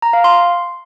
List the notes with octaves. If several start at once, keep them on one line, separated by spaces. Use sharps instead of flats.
A#5
F5
C6